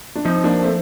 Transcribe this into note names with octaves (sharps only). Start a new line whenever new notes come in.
D4
F3 C4 D#4
A#3 D4
A3 C4